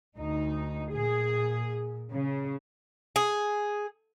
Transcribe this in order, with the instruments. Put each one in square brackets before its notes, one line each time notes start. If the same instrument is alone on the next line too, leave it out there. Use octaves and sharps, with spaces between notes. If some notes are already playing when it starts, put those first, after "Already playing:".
[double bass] D2 [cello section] D#4
[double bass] A#2 [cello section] G#4
[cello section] C#3
[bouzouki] G#4